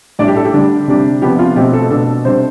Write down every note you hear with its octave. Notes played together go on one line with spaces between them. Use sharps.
A2 G3 D4 D5
G4
A4
G4
D3 G3 D4
C3 G3 D4
C3 F3 B3 D4 G4
F4
B2 A3 C4 G4
A4
B2 B3 D4 A4
C3 G3 D4 C5